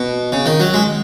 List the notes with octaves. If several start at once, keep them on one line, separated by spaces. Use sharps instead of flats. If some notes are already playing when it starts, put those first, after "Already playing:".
Already playing: B2
C#3
D#3
F#3
G#3